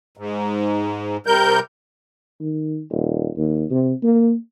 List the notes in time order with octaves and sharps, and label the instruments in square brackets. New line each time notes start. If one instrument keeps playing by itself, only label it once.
[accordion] G#2
C3 G3 A#4 G6
[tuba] D#3
D#1
D#2
C3
A#3